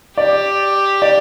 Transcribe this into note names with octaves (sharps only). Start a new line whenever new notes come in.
G4 D5
D5